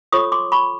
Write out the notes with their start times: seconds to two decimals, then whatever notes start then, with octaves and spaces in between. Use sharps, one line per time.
0.12 F4 A4 C#5 C#6 D#6
0.32 C6 D6
0.52 B5 C#6